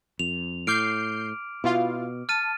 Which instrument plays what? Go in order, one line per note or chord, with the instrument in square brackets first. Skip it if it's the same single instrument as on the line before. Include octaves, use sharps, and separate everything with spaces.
[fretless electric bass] F2 [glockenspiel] F7
[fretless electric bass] A2 [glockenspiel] D6 F6 D7 [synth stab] G6 C7
[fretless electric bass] B2 [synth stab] E4 F4 F5
[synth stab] A5 [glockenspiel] F6 A6 D#7